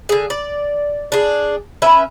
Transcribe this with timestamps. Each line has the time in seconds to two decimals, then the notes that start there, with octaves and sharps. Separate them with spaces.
0.09 D3 G#4
0.30 D5
1.12 D4 G#4
1.82 C#4 B4 E5